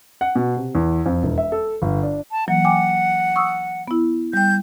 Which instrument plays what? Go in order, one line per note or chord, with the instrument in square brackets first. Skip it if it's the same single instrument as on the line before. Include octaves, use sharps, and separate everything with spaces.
[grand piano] F#5
B2
C3
E2
F2
E1
E5
A4
G1
D4
[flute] A5
[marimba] E3 F#3 A#3 [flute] F#5
[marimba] G5 G#5 D6
C#6 D#6 E6
B3 E4
[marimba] G3 G5 [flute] G6